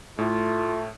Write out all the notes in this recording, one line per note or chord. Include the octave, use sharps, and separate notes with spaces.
A2 A3 F4